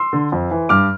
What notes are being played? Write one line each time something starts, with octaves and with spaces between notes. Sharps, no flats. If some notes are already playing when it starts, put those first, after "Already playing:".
Already playing: C6 E6
D3
F2
E3
G2 D6 F6